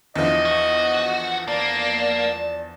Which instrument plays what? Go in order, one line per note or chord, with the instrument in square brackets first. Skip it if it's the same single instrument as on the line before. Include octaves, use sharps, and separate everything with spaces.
[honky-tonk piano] E2 D3 F3 [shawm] D#5
[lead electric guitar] F#4
[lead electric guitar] A#3 [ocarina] D5 [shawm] A5